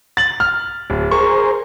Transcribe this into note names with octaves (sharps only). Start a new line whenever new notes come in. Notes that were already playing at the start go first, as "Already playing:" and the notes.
A6 F#7
F6
D1
G#4 A#4 C5 C#6